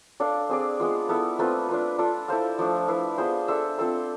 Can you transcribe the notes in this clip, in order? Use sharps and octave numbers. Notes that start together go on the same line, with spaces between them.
D4 A4 D5 F5
C4 G#4 D5
G#3 B3 F4
B3 E4 A4
A3 C4 F4 B4
D4 F4 B4
D4 F4 A4
E4 A4 C5 F5
F3 A3 D4
E4 B4 F5
B3 F4 G#4 C5
D4 A4 C5 E5
C4 F4 A4 C5